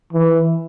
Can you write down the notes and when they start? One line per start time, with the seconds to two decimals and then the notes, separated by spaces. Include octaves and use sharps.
0.13 E3